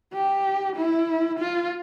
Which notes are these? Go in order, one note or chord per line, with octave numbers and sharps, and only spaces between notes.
G4
E4
F4